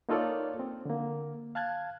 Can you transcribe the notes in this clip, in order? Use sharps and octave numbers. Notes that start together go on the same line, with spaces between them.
A#3 D#4 F4 A4 C#5 D5
C4
D3 A#3
F5 A5 F#6 G#6